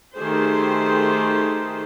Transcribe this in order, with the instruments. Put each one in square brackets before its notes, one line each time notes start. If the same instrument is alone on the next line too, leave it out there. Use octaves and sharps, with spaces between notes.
[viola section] D#3 A3 G4 G#4 C5